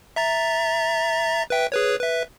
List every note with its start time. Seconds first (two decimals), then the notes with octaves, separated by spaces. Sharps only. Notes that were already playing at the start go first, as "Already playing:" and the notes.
0.16 E5 A#5 A6
1.50 B4 E5 G5
1.72 G#4 B4 C#5
2.01 B4 E5